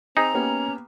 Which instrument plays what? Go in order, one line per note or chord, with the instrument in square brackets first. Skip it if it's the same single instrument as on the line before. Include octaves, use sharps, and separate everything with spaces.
[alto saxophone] C4 [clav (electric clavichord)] D#4 G#4 [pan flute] A#5
[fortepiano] A#3 B3 G4 [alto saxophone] C#4